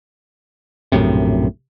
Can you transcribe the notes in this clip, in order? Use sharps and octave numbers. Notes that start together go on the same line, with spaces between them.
A#1 F#2 A2 C3